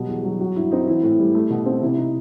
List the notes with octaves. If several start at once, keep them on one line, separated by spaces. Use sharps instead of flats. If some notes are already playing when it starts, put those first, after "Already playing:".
Already playing: B2 F#3 G3
E2
F#3
F#3 F#4
G2 E4
C4 D#4
E3 E4
A2
G3
A3
B2
C4
C3 E4
D#4